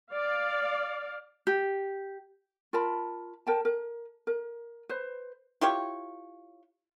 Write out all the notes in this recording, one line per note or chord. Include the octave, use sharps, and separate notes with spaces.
D5 F5
G4
F4 A#4 A5 B5
A#4 G5 A5
A#4
A#4
B4 C5
E4 F4 G4 C#5